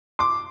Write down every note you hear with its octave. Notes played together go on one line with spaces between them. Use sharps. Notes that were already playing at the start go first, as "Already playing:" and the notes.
C6 D6